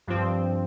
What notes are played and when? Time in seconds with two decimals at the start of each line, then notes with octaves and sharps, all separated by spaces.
0.07 G2 F3 C4